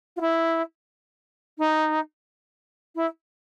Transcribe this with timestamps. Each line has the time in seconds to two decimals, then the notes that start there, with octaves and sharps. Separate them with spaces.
0.17 F4
0.21 E4
1.59 D#4
2.96 E4